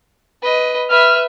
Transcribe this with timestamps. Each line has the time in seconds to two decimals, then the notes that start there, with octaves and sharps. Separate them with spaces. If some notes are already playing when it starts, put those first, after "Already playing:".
0.42 B4 D#5
0.90 B4 E5 F6